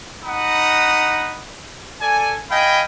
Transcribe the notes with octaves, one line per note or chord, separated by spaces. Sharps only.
D#4 F#5 A#5 B5 D#6
A4 D5 G#5
D#5 F5 G5 G#5 B5